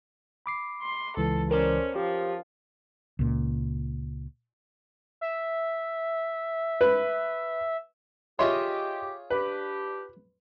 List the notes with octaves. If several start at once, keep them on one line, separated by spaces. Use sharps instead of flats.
B5 D6 C7
C6
C#2 E3 A4
C#4 A#4 C5 D5
F3 G4
C#2 A#2
E5
B4
F4 G4 G#4 C#5 D#5 E5 C6
D4 G4 B4